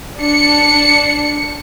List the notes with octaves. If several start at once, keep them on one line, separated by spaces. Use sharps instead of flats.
D4 C#7